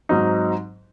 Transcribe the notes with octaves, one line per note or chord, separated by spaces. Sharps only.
G#2 F#3 C4 D#4